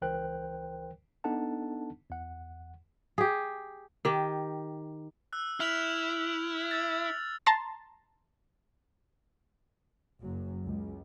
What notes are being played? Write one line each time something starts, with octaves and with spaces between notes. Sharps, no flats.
C#2 E3 A#4 C5 G5 F#6
B3 D4 D#4 A4 F#5 A5
E2 F#5
G4 G#4
D#3 G4
E6 F#6
E4 F6 F7 F#7
F#7
E6 A6
A5 A#5 C6 A6
F#1 F#2 F#3
C#2